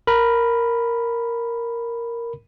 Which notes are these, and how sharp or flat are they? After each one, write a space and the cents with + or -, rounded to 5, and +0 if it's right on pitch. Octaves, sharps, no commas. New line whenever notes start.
A#4 +0 B5 +0